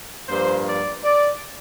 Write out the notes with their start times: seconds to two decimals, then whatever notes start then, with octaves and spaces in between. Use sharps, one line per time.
0.28 G2 F3 A#3 C5
0.66 D5
1.04 D5